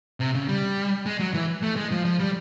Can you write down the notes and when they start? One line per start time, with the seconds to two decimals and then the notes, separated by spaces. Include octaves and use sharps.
0.20 C3
0.35 C#3
0.48 G3
1.06 G#3
1.20 F#3
1.34 E3
1.63 A3
1.76 G#3
1.91 F3
2.05 F3
2.20 G3